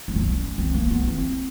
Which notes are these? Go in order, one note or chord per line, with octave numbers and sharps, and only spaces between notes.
C#4
C4
C#4
C4
A#3
B3
C4